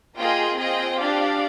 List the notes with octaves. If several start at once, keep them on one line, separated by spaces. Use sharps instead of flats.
A#3 F4 G#4 D#5 G5
C4 F4 G#4 D#5 G5
D4 G4 D5 F5